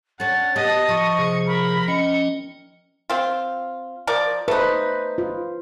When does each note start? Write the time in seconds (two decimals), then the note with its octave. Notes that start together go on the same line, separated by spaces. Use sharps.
0.20 C#4 D4 A4 F#5 A6
0.56 B3 G4 D#5 A5
0.89 F3 C#6
1.19 C3 G#4 C#7
1.47 A#4 B5
1.88 C#4 D#5 G5 C#7
3.10 C4 F4
4.07 F3 A#4 D5
4.48 A3 D#4 B4 C5
5.18 F4